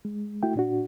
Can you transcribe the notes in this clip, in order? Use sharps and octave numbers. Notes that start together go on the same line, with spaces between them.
G#3
A3 E4 F#4 G5
A#2 D4 F#4